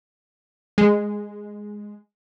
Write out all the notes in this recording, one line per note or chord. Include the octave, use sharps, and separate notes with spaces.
G#3